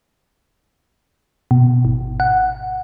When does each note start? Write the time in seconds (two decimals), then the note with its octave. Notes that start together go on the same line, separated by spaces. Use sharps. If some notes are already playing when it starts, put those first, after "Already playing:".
1.51 B2
1.85 G#1
2.20 F#5